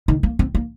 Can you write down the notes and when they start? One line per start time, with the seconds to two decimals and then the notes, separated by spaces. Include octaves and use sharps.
0.08 D#3
0.23 A#3
0.39 C4
0.55 A#3